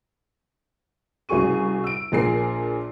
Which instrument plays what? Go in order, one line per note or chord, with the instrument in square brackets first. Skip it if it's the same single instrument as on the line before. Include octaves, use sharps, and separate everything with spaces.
[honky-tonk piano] C2 C#3 F#3 G#4 C#6 D#7
E6 D7
A#1 A#2 G#4 A#4 C7